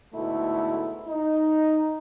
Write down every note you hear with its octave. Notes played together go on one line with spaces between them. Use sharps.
D2 G#2 B2 A3 E4
D#4